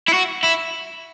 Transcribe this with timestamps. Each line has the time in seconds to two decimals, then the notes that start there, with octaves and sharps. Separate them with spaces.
0.08 E4
0.13 F#4
0.43 E4